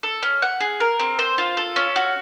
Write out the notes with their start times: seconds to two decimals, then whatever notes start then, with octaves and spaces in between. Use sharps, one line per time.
0.03 A4
0.23 C#4
0.42 F#5
0.61 G#4
0.80 A#4
1.00 C4
1.19 C5
1.38 F4
1.57 A4
1.76 C#4
1.96 F#4